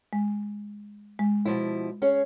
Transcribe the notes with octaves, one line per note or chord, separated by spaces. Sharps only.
G#3
G#3
B2 F3 E4
C#4 G#4 C#5